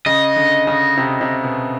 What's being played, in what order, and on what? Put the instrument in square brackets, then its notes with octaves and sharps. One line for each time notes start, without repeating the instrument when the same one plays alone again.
[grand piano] C#3 [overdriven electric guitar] D#5
[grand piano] D3
C#3
C3
C3
B2